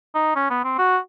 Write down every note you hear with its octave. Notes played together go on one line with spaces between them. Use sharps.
D#4
C#4
B3
C4
F#4